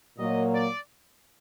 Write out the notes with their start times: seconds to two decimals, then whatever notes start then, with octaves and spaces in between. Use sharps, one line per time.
0.18 A#2 F#3 A#3 D#5
0.54 D5